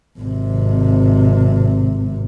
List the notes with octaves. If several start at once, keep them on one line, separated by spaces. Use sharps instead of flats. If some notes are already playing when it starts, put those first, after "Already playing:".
G#1 C3